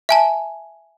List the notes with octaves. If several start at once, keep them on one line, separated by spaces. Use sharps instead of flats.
E5 G#5 A5